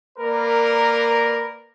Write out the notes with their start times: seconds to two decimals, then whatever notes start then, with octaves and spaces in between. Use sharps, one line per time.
0.19 A#3 A#4 B4 D5